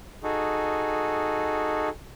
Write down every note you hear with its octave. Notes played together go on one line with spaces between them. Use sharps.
D#4 F#4 G#4 A4